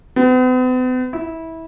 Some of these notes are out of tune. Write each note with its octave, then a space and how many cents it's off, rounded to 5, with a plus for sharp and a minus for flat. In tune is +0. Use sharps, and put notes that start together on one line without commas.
B3 +45
E4 -20